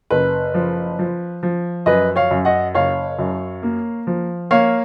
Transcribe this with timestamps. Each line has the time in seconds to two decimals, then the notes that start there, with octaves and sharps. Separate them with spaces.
0.10 F#1 B4
0.54 F3
0.99 F3
1.43 F3
1.86 F#2 B4 D#5
2.16 C#5 F5
2.31 F#2
2.45 D#5 F#5
2.75 F#1 C#5 F5
3.19 F#2
3.63 A#3
4.07 F3
4.51 A#3 C#5 F5